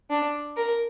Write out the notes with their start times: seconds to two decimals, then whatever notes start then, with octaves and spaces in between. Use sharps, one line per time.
0.10 D4
0.57 A#4